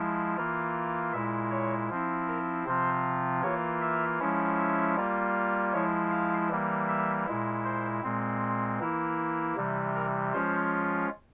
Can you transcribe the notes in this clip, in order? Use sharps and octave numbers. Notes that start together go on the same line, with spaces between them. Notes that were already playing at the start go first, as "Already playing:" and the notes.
Already playing: F3 G#3 E4
E3 A#3 F4
A#2 G#3 E4 E5
C#5
F3 C4 E4
A#4
C3 F3 C4 F4 C5
E3 A#3 F4 C#5
E5
F3 G#3 C#4 E4
E5
G3 A#3 F4
F3 G#3 E4 C#5
F5
E3 G3 A#3
E5
A#2 G#3 E4
C5
A#2 G#3 C4
E3 A#3 E4
C3 E3 G3
A#4
F3 G#3 C#4 F4 C5